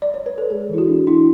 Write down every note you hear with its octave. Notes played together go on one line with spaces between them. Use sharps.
D5
C#5
B4
A4
G#3 G#4
E3 E4
F#4
D4
D4 E4